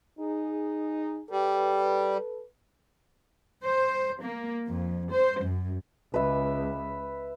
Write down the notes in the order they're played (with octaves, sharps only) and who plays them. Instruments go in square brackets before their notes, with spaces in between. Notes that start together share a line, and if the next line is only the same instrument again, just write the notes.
[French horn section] D#4 G#4
[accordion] G3 [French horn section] A4 B4
[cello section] C5
A#3
F2
C5
F#2
[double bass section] C#2 [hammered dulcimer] B4 E5